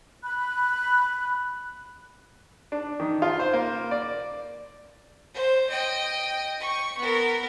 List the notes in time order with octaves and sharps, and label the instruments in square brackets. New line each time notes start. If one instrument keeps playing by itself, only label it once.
[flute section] B5 F#6
[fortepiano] D4
D#3
F4
C5
A#3
D5
[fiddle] C5
D#5 G5
C#6
B3 A#4